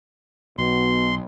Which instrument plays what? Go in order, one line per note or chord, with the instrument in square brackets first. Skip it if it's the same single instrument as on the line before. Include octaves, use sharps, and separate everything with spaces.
[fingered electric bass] B1 [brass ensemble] B2 [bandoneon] C6